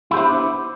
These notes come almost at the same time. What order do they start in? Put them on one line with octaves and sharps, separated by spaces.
E4 G4 C5 D4 B3